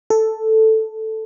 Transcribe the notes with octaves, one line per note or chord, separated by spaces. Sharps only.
A4